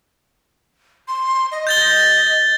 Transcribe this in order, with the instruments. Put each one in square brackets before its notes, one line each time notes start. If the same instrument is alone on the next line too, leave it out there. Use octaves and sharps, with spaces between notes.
[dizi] C6
D#5
[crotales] G6 A6 G7